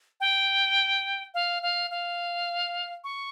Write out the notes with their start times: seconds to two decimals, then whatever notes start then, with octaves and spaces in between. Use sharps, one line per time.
0.20 G5
1.34 F5
1.63 F5
1.91 F5
3.04 C#6